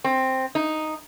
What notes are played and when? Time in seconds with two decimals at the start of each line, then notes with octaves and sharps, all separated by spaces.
0.04 C4
0.55 D#4